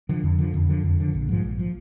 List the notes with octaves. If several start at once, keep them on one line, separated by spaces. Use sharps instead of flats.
D3 F3
F2
D3 F3
F2
D3 F3
F2
D3 F3
A#1
G#2 F3
A#1
F3